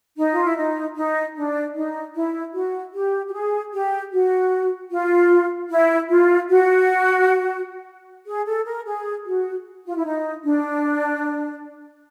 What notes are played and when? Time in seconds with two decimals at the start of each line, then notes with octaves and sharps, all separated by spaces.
0.18 D#4
0.32 F4
0.44 E4
0.57 D#4
0.96 D#4
1.36 D4
1.75 D#4
2.15 E4
2.54 F#4
2.94 G4
3.28 G4
3.33 G#4
3.73 G4
4.12 F#4
4.91 F4
5.70 E4
6.10 F4
6.49 F#4
8.27 G#4
8.47 A4
8.66 A#4
8.87 G#4
9.26 F#4
9.86 F4
9.96 E4
10.05 D#4
10.44 D4